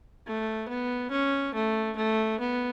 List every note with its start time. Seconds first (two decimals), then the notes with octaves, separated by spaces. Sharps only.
0.27 A3
0.69 B3
1.11 C#4
1.54 A3
1.97 A3
2.40 B3